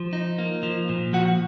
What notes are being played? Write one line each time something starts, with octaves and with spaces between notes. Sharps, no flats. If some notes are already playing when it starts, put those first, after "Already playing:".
Already playing: F3
D#4
A#3
F3
A#2
F3 F#4 F#5